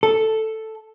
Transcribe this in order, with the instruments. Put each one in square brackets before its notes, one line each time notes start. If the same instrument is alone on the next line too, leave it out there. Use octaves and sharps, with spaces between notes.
[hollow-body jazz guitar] A4